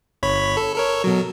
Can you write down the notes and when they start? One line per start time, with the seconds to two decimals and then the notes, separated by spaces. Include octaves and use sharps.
0.23 G1 C#5 B5
0.57 A4
0.75 A4 A#4 C#5
1.04 B2 F#3